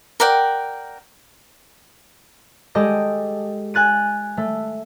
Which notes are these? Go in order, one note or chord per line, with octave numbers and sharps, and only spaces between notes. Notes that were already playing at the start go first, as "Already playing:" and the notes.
A#4 D5 F#5 G5
G#3 G4 A4 D#5
G#5 F#6 A6 D#7
A3